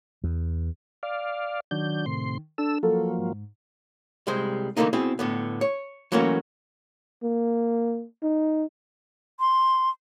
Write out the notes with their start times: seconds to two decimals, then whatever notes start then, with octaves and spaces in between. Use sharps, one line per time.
0.24 E2
1.03 D5 F5
1.71 D#3 F#3 D4 G6
2.06 A2 C3 C6
2.58 D4 A4 E6
2.83 F3 F#3 A#3 A4
3.18 G#2
4.27 C2 G3 G#3 C5
4.77 D3 E3 F3 A3 A#3 D#4
4.93 B2 C4 E4 G#4
5.19 A2 D3 B3
5.61 C#5
6.12 E3 F#3 A3 A#3 C#4 F#4
7.23 A#3
8.23 D#4
9.40 C6